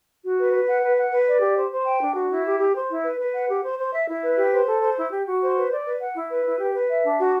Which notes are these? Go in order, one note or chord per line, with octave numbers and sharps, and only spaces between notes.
F#4
B4
B4
F#5
B4
F#5
B4
D5
G4
C5
C5
G5
D4
F#4
E4
G4
G4
C5
E4
B4
B4
F#5
G4
C5
C5
E5
E4
B4
G4
C5
A4
C5
E4
G4
F#4
C5
B4
D5
B4
F#5
E4
B4
E4
G4
B4
E5
D4
F#4